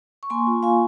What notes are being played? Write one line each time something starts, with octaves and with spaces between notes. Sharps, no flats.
C#6
A#3 G#5 C6
F4
F4 F5 G#5